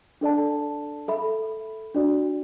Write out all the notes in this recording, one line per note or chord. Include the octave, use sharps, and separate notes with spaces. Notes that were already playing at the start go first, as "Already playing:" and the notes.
D4 A4 D5 A5
A4 E5 B5
D4 F#4 D5